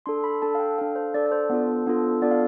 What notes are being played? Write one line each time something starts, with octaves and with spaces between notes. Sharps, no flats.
D4 A4 C6
B5
D4 A4 A5
F5
G5
D4 A4 F5
C5
D4 A4 D5
D5
C5
B3 D4 F4 A4
B3 D4 F4 A4
B3 D4 F4 A4 D5
F5